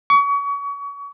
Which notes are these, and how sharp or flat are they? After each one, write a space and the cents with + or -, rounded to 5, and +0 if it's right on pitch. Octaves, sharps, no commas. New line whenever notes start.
C#6 +35